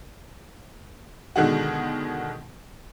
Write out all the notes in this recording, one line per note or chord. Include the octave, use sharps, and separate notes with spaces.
B2 D3 D#3 G#3 F#4